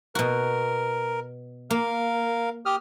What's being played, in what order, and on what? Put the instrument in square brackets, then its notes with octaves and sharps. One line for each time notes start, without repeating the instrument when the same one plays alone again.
[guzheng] B2 F#4 [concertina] A#4
[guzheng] A#3 [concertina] A#4 F5
[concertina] G4 D#6 F6